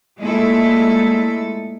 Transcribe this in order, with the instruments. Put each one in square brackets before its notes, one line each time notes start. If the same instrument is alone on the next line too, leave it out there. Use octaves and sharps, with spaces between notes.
[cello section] A#2 G#3 A3 E4 A4